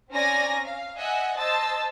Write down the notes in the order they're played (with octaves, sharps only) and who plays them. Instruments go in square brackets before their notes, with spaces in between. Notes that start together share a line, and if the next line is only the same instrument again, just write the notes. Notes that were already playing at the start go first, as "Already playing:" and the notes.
[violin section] C4 C#4 D5 G#5 A#5 A#6
F5
D#5 E5 F#5 G#5
C5 D#5 A5 E6 A6